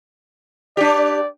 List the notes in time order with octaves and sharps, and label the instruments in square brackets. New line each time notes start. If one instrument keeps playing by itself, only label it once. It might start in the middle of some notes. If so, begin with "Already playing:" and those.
[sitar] D4 G4 [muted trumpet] D5